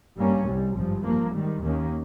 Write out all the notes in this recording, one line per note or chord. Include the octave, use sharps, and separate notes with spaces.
G2 G3 A#3 C#4
C2 C3 G3
G#1 G2 F3
G2 F3 A#3
G#2 D#3 G3
D#2 D#3 A#3 C#4